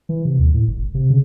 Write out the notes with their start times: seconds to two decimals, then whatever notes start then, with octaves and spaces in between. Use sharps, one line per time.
0.09 E3
0.25 C3
0.39 D#2
0.54 A2
0.68 G1
0.79 G1
0.95 C3
1.10 C#3